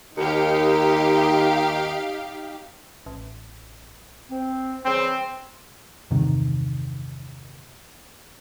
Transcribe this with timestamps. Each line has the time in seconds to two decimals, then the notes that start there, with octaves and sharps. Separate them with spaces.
0.17 D#2 D#4 G4 F5
3.06 A1
4.30 C4
4.85 C#3 E3 G3 C4
6.11 E2 G2 C3 D#3